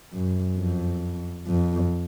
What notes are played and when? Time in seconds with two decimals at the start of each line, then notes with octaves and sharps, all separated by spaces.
0.13 F#2
0.58 F2
1.47 F2